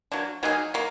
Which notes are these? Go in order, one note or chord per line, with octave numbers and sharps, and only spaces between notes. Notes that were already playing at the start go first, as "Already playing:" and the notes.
F#3 A#3 D4
F#3 A#3 D#4 G#4
F#3 A#3